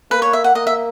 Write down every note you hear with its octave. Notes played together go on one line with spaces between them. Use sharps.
A#3 B4
C#5
E5
F#5
A#3 D#5
E5